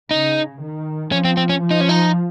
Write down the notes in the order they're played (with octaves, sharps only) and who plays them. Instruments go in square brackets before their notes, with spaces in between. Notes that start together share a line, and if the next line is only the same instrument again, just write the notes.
[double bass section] C#3 [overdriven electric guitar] D#4
[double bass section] D#3
[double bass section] F3 [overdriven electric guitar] C#4
[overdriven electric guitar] C4
C4
C#4
[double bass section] F3
[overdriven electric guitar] D#4
C#4
D#4